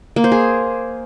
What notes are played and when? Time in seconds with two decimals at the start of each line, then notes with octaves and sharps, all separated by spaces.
0.16 A#3
0.24 C5
0.32 G#4